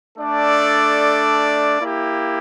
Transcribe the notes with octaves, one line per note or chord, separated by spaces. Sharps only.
A3 D4 A4 D5
A#3 E4 G4